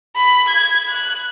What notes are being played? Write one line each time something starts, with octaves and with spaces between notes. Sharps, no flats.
B5
G#6
F#6